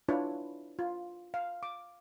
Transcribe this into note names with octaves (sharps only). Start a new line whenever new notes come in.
D4 E4 F4 B4 C#5
F4
F5
D6